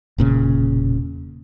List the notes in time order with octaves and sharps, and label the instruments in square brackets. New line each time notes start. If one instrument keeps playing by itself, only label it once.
[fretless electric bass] E1 A#2 C#3